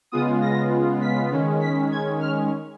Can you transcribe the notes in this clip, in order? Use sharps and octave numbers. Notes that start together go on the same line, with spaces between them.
C#3 G#3 B3 F4 D#6
A#6
B6
D#3 G#3 C#4
B6
G#6
F6